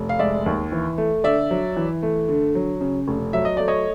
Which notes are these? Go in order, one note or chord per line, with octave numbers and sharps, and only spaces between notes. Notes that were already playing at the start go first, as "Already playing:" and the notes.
Already playing: F1
F5
G#3 D5 E5
D#2
E3
A3
D3 D5 E5
F#3
E3
A3
D3
F#3
C#3
F1
F#3 E5
D#5
A3 D5
C#5 D#5